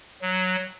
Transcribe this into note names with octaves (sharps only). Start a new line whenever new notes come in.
F#3